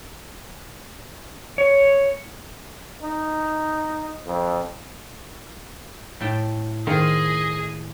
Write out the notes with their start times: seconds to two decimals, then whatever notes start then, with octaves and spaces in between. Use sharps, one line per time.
1.58 C#5
3.02 D#4
4.26 F2
6.20 A2 G5 A5
6.87 D#3 F4 G#4 C5 D#5